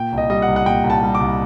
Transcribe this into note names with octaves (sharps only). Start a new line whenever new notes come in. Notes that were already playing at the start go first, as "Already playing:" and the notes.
Already playing: A#2 G5
C2
D#5
G3 D#5
F#5
C2
F#5
A#2 G5
C2
A5
G3
D6
C2